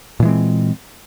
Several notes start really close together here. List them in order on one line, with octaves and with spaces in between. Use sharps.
A#2 E3 G#3 C4